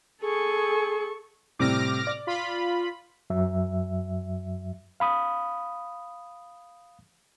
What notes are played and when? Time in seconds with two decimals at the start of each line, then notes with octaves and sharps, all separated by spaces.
0.22 G#4 A4 C#6
1.59 A2 C3 G3 D6 F6 A#6
2.07 D5
2.27 F4 B5
3.30 F#2 F#3 E5
5.00 F5 B5 D#6